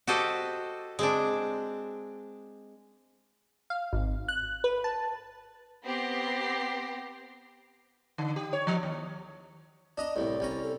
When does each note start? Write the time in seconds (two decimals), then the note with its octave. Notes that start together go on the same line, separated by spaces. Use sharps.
0.07 F#4 G4 A4 C5 D#5
0.99 G#3 C4 D4
3.70 F5
3.93 G#1
4.28 F#6
4.64 B4
4.84 A5
5.84 B3 C4 G4 A#6 C7
8.18 D3
8.36 G4
8.53 C#5
8.67 F3
8.83 D#2
9.98 D4 D#5 A#5
10.16 C2 A2 D5
10.40 C2 C#4 A#5
10.63 A4